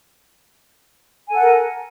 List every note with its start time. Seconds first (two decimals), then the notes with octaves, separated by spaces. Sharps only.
1.27 G#5
1.32 A4
1.36 F#5
1.41 A#4